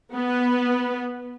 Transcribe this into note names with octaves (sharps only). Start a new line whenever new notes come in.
B3 B4